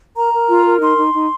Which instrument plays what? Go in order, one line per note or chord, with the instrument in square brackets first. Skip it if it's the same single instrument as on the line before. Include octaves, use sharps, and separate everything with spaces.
[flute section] A#4 A#5
A#4
F4
A#4
D#4 C6
D#4
D#4